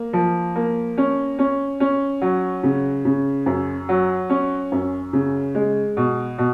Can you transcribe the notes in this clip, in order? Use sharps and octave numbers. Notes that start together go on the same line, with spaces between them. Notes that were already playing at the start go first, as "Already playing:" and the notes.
Already playing: A#3
F3
A#3
C#4
C#4
C#4
F#3
C#3
C#3
F#2
F#3
C#4
F#2
C#3
G#3
B2
B2